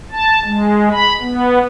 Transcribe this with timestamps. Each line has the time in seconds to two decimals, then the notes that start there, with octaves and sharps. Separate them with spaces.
0.12 A5
0.43 G#3
0.91 B5
1.21 B3